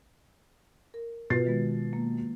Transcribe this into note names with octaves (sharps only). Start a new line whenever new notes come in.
A#4
B2 F4 B4 A6 C7
D#3 G#3 B3
A#3